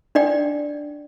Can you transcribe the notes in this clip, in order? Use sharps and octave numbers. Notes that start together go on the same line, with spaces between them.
D4 D5 G5